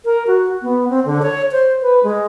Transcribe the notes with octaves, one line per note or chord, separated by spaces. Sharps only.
A#4
F#4
B3
C4
D3
C#5
C5
B4
G#3